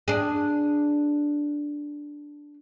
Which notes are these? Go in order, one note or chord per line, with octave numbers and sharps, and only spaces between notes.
D4 G#4